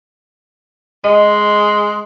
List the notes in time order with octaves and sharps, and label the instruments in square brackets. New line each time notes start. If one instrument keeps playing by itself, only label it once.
[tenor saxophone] G#3 [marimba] D#5